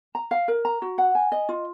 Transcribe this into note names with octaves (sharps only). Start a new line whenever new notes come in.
A#5
F5
A#4
A#5
F#4
F#5
G#5
D#5
F4